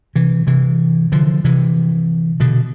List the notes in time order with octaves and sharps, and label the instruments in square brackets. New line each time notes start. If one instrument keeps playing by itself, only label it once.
[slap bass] C3 E3
C3 E3
D3 F3
C3 E3
B2 D3